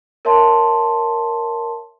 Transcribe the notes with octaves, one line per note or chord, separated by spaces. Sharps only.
A#4 C#5 E5 A5 C6